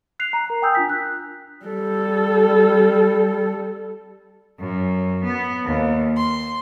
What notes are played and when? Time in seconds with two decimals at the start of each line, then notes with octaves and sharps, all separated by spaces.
0.19 F#6 C7 F7
0.33 A#5
0.50 A#4
0.62 G5 G#5 D#6 E6 G6
0.75 D4 F4 B6
0.89 F#6
1.65 G3 A4
4.60 F#2
5.25 B3
5.65 D#2
6.16 C6